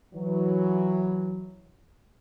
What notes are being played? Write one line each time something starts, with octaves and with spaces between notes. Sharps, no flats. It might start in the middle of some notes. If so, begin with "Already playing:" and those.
E3 F#3